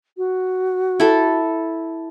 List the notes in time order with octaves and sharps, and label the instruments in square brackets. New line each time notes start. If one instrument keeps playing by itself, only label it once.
[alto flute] F#4
[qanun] E4 A4